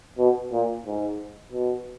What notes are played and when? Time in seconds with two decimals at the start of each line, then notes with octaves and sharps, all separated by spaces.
0.18 B2
0.52 A#2
0.86 G#2
1.52 B2